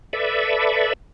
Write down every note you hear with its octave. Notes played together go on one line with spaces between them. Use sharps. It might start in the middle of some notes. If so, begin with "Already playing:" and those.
A4 B4 D5 E5